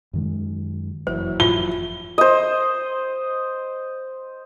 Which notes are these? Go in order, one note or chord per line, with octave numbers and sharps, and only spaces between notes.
F#2 D#3 G#3
F#1 F2 E3 F#3 C5
F4 G7
C5 D#5